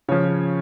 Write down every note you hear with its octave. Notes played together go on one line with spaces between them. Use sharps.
C#3 F3 C#5